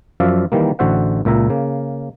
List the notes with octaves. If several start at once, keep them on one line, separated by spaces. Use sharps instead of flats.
F#2 F3 D5 E5 F5
D#3 E3 G3 A#3
A1 D3 F#4 C5 E5 F#5
C#2 A#2 E5 A#5
C#3 A#3